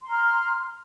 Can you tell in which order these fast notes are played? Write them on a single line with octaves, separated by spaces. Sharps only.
C6 A#5 F6